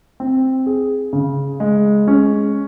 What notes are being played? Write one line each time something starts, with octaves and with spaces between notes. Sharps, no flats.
C4
G#4
C#3
G#3
C#4